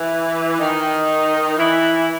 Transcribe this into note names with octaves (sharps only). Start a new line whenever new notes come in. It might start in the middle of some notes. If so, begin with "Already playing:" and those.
Already playing: E3
D#3 D#4
E3 E4